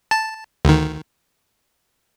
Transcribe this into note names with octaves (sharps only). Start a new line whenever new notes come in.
A5
D2 D#3